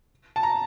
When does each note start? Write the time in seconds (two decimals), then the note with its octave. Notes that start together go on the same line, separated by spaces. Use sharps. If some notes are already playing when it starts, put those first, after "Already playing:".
0.36 A5
0.43 A#5